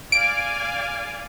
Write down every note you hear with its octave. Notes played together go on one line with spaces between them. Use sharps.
D5 F5 G#5 D7